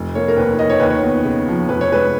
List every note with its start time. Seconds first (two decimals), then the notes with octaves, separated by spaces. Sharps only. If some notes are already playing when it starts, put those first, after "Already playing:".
Already playing: F1
0.15 A#3 C#5
0.28 A#4
0.37 D#2 B4
0.59 D#3 D#5
0.70 C#5
0.80 D#2 B4
0.90 C#5
1.03 B3
1.25 C#3
1.48 F3
1.69 F1 B4
1.81 C#5
1.92 G#3 B4